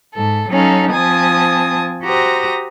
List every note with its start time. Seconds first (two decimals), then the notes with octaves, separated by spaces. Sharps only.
0.13 G#2 A4
0.48 F#3 C#4 D#4 A4 F5
0.91 F3 C4 G#5 A5 D#6
2.03 F#4 G4 C5 A#5 D#6